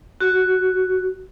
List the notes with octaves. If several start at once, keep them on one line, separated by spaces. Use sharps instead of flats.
F#4